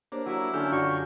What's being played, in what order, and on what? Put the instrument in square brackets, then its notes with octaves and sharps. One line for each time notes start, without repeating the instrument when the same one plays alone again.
[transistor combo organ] A#3 D4 [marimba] G4 C5 C#5
[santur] F#3 [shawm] E4
[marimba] D3 D4 [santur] C#4 A4 [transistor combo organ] F4 G4
[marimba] F#2 D3 [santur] C#4 D4 F#4 [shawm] C#6